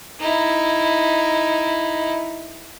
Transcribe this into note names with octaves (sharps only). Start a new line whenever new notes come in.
D#4 E4